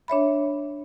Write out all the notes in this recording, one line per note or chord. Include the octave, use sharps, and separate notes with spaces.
D4 C#5 E5 B5